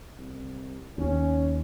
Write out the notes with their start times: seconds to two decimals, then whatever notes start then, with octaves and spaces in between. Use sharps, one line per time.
0.16 C2
0.98 D#2 C#4